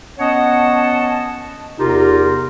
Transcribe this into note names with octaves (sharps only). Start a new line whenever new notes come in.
B3 C#4 C#5 D#5 F#5 A5
E2 C3 D#4 F4 G4 A#4